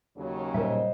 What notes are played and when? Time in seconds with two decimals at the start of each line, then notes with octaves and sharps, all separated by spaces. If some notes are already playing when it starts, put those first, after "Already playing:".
0.16 D#2 C#3 F#3
0.54 A#2 G3 A#4 C5 D#5 E5